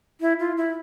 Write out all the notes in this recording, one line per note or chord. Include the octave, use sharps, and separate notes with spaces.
E4
F4
E4